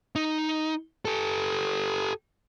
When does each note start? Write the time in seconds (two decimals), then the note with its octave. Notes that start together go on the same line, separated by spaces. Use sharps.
0.16 D#4
1.05 G4 A4